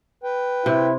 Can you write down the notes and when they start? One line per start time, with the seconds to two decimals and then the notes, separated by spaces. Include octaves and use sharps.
0.23 B4 G5
0.66 C3 E4